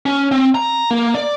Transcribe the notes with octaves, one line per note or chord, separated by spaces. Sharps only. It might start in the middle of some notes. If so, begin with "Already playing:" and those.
C#4
C4
A#5
A#3
D5